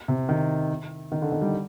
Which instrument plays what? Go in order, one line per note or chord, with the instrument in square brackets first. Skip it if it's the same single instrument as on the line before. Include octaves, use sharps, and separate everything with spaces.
[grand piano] C3
D#3
D#3
D3
D#3
G3